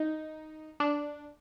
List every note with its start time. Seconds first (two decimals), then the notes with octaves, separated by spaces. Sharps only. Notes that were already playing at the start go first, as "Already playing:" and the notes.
Already playing: D#4
0.80 D4